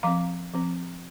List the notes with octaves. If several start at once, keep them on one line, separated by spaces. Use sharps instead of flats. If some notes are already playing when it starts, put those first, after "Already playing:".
F3 C4 F5 A#5
F3 C4